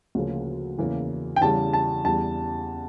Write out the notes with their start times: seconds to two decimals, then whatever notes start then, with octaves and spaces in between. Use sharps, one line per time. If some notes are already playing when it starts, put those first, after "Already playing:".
0.15 D2 C#3 F3 A#3
0.78 E2 C#3 E3 A#3
1.36 G5
1.41 E2 C#3 G3 A5
1.73 A5
2.04 E2 E3 G3 A5